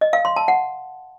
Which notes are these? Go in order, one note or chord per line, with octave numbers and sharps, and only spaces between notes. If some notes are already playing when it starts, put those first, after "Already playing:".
D#5
F5
C6
A5
F#5